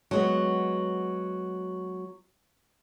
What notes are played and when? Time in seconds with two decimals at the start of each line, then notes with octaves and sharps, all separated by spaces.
0.11 F#3 G#3 B3